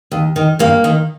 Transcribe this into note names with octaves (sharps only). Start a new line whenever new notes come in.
D#2
D#3
G2 A#3
D#3